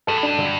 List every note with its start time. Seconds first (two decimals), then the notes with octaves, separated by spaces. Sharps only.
0.07 G2 A4
0.17 A2
0.23 G2 D4
0.38 D3